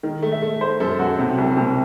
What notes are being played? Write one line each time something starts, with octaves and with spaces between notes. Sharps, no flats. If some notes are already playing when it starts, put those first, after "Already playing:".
D#3
A3
E5
A3
A3 C5
F#2 A4
F#2 F#4
C3
C2
C3